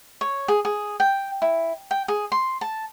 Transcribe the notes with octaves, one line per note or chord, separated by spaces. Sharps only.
C#5
G#4
G#4
G5
E4
G5
G#4
C6
A5